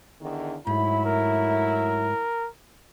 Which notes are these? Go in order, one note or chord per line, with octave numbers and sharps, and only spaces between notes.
E2 D3 D#3
G#2 F#3 A3 E4 B5
A#4